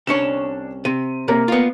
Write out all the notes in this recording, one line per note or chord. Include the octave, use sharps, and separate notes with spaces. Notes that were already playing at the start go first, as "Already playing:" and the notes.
C2 C#4 D4 C#5 E7
C3 D#7
C3 A#3 A#4
B3 F4